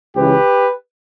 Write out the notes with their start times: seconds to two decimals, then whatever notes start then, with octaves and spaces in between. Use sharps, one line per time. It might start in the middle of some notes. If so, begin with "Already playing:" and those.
0.15 C#2 C#3 E3 G4 B4